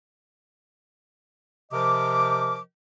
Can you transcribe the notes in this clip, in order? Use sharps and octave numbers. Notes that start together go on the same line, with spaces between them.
C3 F3 A#4 D#5 D6